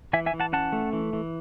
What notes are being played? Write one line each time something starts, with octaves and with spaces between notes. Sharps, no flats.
E3 E5 G#5
E5 G#5
E3
F#5 A5
C#4 F#5 A5
A3
E3
E3